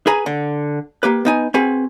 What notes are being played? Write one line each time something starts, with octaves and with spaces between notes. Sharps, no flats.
G#4 B4 G#5 A#5
D3
A#3 G4 B4
B3 D#4 G#5
C4 F#4 G#4 B4 G#5